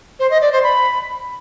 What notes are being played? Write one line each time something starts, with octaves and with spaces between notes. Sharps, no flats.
C5
D#5
D5
C5
B5